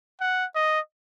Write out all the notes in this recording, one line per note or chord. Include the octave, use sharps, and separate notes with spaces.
F#5
D#5